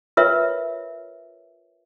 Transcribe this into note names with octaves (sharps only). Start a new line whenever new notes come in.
F4 A#4 B4 C#5 E5